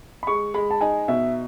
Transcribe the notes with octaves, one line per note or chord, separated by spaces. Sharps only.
B5
G#3 C#6
G#3 B5
A5
D#4 G#5
B2 E5